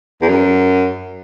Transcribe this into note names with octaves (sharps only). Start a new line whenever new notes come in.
E2
F#2